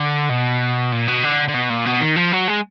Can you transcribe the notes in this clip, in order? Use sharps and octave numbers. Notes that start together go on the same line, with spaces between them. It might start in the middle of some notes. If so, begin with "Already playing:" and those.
Already playing: D3
B2
A#2
B2
D3
D3
B2
A#2
B2
D#3
F3
F#3
G#3